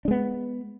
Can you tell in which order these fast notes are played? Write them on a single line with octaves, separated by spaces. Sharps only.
D4 G#3 B3